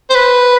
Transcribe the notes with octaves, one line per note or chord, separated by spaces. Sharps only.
C5
B4